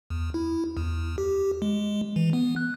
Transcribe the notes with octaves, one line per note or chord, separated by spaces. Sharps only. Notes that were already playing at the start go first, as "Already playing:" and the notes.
E2
E4
E2
G4
G#3
E3
B3
F#6